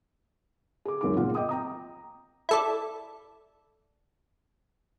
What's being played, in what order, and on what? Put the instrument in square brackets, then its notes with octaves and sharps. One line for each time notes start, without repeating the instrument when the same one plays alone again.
[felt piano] G#4 D6
C#2 F#2 D#3 D6
G1 A#2 G#3 F4 F#5
D#5 G5 D6 D#6
G5 A#5 D#6
[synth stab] E4 A4 D5